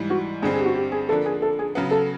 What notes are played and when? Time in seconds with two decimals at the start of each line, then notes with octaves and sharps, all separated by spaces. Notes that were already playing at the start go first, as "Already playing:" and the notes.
Already playing: G#2 E3 G3
0.10 F#4
0.42 G2 D3 G3 C4 G#4
0.53 G#4
0.59 G4
0.65 F#4
0.75 G4
0.92 G#4
1.09 D3 F3 A#3 D4 A4
1.26 G#4
1.42 A4
1.59 G#4
1.75 C#3 F#3 B3
1.91 A4